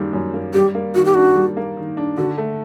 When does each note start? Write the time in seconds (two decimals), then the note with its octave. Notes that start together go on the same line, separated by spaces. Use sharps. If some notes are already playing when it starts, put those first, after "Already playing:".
Already playing: F#2 D#3 G3 A#3
0.13 F#2
0.34 A#3
0.54 G3 G4
0.75 A#3
0.95 D#3 F#4
1.05 G4
1.14 D4 F#4
1.36 G3
1.57 A#3
1.77 D#3
1.97 D4
2.17 D3 F#4
2.38 A3